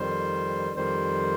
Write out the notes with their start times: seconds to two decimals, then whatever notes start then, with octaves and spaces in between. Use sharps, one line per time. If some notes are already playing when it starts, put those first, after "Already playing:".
Already playing: F2 D#3 G3 C5
0.76 F2 D#3 G3 C5